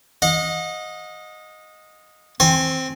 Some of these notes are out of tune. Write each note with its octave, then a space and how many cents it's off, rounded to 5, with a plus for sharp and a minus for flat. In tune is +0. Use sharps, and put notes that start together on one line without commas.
D#5 +0 F#5 -40
C4 +0 G#5 +10 C6 +25